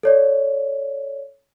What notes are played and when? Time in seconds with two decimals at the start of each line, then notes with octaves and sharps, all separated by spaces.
0.03 A4 C#5 D5